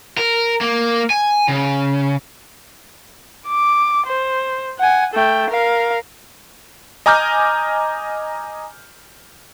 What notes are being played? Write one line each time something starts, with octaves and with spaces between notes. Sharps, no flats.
A#4
A#3
G#5
C#3
D6
C5
F#5 G#5
A3 G5
A#4 F5
D#5 G#5 A#5 D6 F6 G6